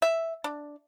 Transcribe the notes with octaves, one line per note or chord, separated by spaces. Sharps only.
E5
D4